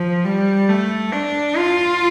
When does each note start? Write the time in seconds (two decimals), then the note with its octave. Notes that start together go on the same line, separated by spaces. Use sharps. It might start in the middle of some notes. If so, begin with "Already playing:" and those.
Already playing: F3
0.25 G3
0.69 A3
1.12 D4
1.57 F4